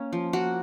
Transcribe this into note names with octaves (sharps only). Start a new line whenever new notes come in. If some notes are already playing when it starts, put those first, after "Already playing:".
Already playing: A#3 C#4
F3
A#3 F#4